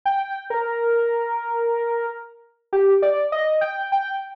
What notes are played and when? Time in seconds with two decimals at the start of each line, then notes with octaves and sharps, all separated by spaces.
0.05 G5
0.50 A#4
2.73 G4
3.02 D5
3.32 D#5
3.61 G5
3.92 G5